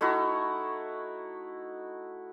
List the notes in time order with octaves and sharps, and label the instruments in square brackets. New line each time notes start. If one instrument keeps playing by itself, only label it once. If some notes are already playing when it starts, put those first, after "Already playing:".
[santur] A3 D#4 E4 F#4